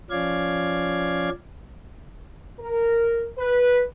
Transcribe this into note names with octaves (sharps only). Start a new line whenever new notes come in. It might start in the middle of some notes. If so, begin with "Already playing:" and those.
F3 C#4 D5 F5 G#6
A#4
B4